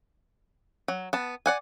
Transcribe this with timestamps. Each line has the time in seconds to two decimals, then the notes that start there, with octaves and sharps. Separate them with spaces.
0.88 F#3
1.13 B3 A5
1.46 D5 F#5 G#5